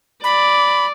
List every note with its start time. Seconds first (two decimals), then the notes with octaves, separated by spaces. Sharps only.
0.24 D5 B5